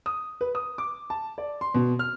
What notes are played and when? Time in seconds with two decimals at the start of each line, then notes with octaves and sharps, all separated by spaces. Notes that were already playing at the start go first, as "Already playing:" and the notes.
0.06 D#6
0.41 B4
0.55 D#6
0.78 D6
1.10 A5
1.38 D5
1.61 C6
1.74 B2
1.99 F6